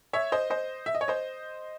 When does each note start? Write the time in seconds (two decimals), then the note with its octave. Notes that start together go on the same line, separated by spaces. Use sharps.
0.13 C#5 E5
0.32 C5 D#5
0.50 C5 D#5
0.86 E5
0.95 D#5
1.01 C#5
1.08 C5 D#5